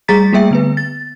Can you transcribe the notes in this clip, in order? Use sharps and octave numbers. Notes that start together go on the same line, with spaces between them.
G3 A3 G#4 A#5 A6 B6
G3 A3 A#3 G#4 E5 G5
D3 B3 B4
A6